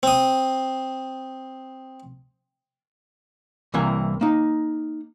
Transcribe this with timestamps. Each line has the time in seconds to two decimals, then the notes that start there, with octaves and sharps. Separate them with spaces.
0.03 C4 D#6
3.74 C2 C3 E3 A#3 G#5
4.21 A#3 D#4